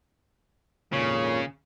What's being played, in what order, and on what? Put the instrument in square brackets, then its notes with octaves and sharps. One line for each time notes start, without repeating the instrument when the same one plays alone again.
[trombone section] G#1 F2 A#2 [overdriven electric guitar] C#3 [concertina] C#5